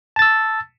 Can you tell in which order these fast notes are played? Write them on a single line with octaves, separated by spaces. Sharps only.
A5 A6 E6